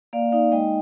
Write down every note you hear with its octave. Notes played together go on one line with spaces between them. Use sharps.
A#3 D5 F5
D#4 D5 F5
G#3 D#5 G5